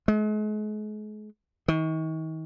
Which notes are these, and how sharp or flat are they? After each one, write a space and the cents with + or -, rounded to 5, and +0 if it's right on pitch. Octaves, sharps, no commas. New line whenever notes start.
G#3 +40
D#3 +40